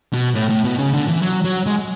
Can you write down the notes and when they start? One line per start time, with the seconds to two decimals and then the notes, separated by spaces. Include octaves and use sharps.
0.13 B2
0.35 A2
0.49 A2
0.64 B2
0.79 C#3
0.93 D3
1.08 E3
1.22 F#3
1.44 F#3
1.66 G#3